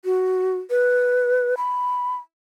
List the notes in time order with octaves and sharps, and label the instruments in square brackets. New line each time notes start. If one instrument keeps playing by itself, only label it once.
[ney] F#4
B4
B5